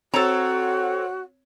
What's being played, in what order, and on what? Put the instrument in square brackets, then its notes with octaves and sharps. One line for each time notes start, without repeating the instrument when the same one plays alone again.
[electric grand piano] C4 C#5 [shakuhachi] F#4 [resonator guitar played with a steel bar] A4 A#5